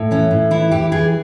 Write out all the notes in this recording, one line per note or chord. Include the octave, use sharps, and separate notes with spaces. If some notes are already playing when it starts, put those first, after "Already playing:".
Already playing: A2
E3 C#4
A2
E3 E4
E3 G4
E3 G#4